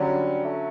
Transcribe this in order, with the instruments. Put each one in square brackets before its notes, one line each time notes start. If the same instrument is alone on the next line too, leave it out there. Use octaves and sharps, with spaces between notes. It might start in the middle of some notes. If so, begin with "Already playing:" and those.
Already playing: [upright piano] D3 F#3 C#4 [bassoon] G3
[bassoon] A3